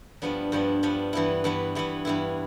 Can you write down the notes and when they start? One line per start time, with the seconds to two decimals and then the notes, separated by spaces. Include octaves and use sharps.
0.22 G2 F3 B3 D4
0.52 G2 F3 B3 D4
0.83 G2 F3 B3 D4
1.13 G2 E3 B3 E4
1.44 G2 E3 B3 E4
1.75 G2 E3 B3 E4
2.05 G2 E3 B3 E4